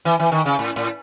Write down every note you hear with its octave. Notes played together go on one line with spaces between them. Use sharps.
E3
E3
D#3
C#3
A2
A2